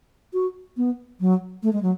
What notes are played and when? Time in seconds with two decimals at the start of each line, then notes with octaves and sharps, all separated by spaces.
0.33 F#4
0.77 B3
1.20 F#3
1.63 A3
1.73 G#3
1.82 F#3